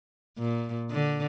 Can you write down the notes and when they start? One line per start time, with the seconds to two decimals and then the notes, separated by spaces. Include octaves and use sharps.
0.38 A#2
0.91 D3